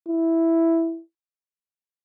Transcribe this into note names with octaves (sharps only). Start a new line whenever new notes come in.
E4